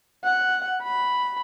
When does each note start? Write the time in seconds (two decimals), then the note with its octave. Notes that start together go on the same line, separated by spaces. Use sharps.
0.24 F#5
0.83 B5